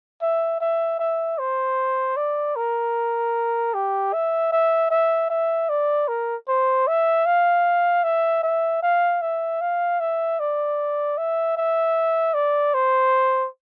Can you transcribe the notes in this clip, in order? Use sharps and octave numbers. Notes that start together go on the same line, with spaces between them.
E5
E5
E5
C5
D5
A#4
G4
E5
E5
E5
E5
D5
A#4
C5
E5
F5
E5
E5
F5
E5
F5
E5
D5
E5
E5
D5
C5